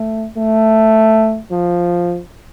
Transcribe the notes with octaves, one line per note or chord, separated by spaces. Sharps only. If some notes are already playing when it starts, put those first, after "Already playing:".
Already playing: A3
A3
F3